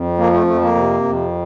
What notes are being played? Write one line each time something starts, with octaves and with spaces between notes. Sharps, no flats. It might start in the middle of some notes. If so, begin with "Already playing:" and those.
Already playing: F2
F3 A#3
A3
F2 A3
A#3
C3
F2